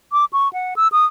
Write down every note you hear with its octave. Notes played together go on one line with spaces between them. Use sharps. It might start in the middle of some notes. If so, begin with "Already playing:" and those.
D6
C#6
F#5
E6
D#6